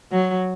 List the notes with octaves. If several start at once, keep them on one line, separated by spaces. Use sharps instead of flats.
F#3